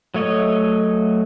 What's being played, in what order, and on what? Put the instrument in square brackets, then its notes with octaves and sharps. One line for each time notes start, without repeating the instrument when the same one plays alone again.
[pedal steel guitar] F#3 A3 C#5 D#5